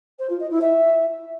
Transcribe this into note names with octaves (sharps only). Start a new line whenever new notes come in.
C5
F4
D#5
E4
E5